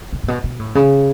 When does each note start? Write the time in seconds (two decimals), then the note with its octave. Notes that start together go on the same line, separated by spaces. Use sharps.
0.13 B2
0.23 A2
0.28 B2
0.44 B2
0.59 A2
0.75 C#3